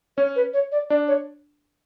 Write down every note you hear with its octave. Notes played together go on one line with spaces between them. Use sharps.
C#4 C#5
B4
C#5
D5
D4 D5
C#5